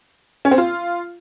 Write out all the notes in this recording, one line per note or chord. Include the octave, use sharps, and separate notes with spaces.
C#4
C4
F4